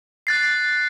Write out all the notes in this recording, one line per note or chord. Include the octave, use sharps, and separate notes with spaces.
F#6 A6 C7